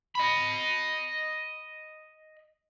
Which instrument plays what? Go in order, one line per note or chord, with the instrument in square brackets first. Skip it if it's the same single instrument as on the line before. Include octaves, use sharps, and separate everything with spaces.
[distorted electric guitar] D#5 B5